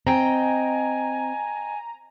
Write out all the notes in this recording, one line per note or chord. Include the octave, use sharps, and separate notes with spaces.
C4 D#5 G5 G#5 A#5